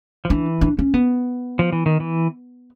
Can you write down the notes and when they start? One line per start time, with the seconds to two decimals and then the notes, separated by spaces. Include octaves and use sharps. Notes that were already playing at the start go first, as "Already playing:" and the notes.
0.25 F3
0.29 E3 D4
0.61 D4
0.79 C#4
0.94 B3
1.59 F3
1.73 E3
1.86 D#3
2.00 E3